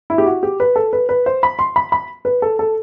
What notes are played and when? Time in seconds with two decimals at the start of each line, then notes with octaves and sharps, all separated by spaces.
0.10 E4
0.18 G4
0.26 F#4
0.43 G4
0.60 B4
0.76 A4
0.93 B4
1.09 B4
1.26 C5
1.43 B5
1.59 C6
1.76 B5
1.92 B5
2.25 B4
2.42 A4
2.59 A4